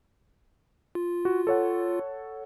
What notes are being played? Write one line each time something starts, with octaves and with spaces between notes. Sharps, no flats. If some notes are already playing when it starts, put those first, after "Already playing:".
F4
F#4
A4 C#5 F#5